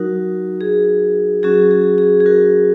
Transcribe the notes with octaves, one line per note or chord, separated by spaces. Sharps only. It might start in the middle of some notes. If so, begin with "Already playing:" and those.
Already playing: F#3 D#4 F#4 A#4
G#4
F#3 C#4 F#4 G#4
G#4
G#4
G#4
F#4 A#4